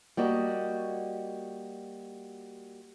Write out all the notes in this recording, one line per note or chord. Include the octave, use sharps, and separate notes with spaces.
G3 A#3 F#4 D#5